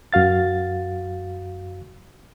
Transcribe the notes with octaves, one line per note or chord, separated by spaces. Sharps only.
F#2 F#4 F5 A6